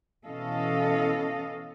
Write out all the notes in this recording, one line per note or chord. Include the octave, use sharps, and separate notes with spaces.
B2 E3 C#4 A4 D#5 F5